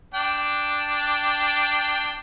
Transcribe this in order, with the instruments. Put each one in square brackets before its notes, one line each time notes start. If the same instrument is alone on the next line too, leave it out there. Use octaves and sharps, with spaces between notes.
[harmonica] D4 G5